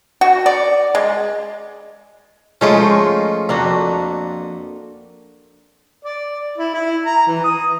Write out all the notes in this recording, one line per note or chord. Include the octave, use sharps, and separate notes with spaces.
F#4
D5
G#3
F3 G#3 A3 C#4 D#4 F4
F2 A#3 D4 F#4
D5
E4
E4
A#5
E3
D#6